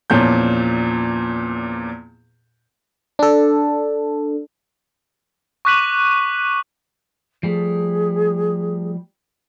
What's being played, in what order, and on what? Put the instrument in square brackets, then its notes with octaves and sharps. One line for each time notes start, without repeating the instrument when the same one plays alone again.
[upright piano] E2 A#2 F3 C#4 G6
[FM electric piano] D4 A4
[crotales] C#6 D6 F#6 B6 D#7 F#7
[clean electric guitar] F3 G3 A3 [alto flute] G#4